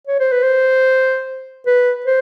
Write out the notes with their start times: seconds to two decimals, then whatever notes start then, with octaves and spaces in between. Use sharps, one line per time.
0.07 C#5
0.19 C5
0.32 B4
0.43 C5
1.67 B4
2.06 C5